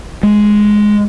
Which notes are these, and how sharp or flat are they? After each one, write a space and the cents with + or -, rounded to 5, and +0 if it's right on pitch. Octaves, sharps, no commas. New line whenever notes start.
G#3 +5